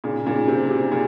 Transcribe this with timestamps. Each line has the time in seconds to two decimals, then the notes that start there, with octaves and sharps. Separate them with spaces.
0.04 A#2 C#3
0.26 A#2 C#3
0.48 C3
0.70 C3
0.92 A#2 C#3